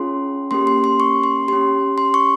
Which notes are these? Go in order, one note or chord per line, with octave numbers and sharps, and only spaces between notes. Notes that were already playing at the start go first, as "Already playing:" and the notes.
Already playing: C#4 F4 G#4 C6
A#3 C#4 G4 C6
C6
C6
C#6
C6
C#4 G4 C6
C6
C#6